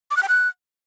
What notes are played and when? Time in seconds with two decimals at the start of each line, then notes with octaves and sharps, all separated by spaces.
0.11 D6
0.17 F#6
0.23 G5
0.29 F#6